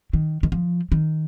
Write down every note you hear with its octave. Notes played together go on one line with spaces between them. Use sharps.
D#3
D#3
F3
D#3